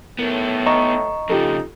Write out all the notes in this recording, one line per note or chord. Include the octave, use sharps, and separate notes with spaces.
A2 B3 D#4 A#4
D#5 A#5 C#6 E7
F2 C#3 D#4 F4 G4 A4